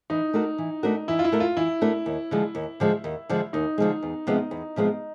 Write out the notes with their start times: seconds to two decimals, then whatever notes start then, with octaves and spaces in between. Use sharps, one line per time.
0.10 E3 D#4
0.33 A3 D4 F#4 A#4
0.58 E3
0.83 A3 D4 F#4 A#4
1.08 E3 E4
1.19 F4
1.24 E4
1.32 A3 D4 F#4 A#4
1.40 F4
1.57 E3 E4
1.81 A3 D4 F#4 A#4
2.06 D#2
2.31 D3 F3 G#3
2.55 D#2
2.80 D3 F3 G#3
3.04 D#2
3.29 D3 F3 G#3
3.53 D#2 D#4
3.78 D3 F3 G#3
4.03 E2
4.27 C3 F3 G#3 B3
4.51 E2
4.76 C3 F3 G#3 B3